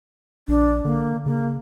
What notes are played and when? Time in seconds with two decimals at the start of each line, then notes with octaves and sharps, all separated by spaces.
0.48 A#1 D4
0.85 D3 A#3
1.26 C#3 A#3